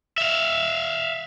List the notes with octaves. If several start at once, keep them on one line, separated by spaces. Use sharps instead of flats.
E5 F5